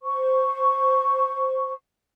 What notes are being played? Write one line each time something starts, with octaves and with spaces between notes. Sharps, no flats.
C5 C#6